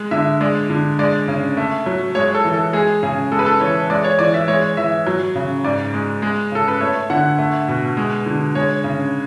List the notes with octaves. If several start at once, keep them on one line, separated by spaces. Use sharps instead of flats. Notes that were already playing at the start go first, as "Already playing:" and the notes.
Already playing: G#3
D3 E5
G#3 D5
D3
G#3 D5
C#3
A3
F#3
G#3 C#5
A4
E3
A4
G#3 G#4
C#3 G#4
G#3 A4
B4
A4
E3 C#5
G#3 D5
C#5
E3 D5
E5
G#3 C#5
E3 E5
F#3
C#3
G#2 D5
G#3
G#3
C#3 A4
B4
A3 C#5
D3 F#5
A3
B2
G#3
D3
G#3 C#5
C#3